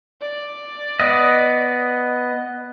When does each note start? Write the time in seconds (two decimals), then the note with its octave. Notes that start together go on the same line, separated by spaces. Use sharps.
0.21 D5
1.00 B3 D#5